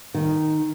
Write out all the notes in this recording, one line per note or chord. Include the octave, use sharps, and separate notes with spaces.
D#3